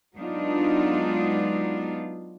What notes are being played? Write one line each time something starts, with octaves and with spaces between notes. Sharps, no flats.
F#3 G#3 B3 D4 D#4 F4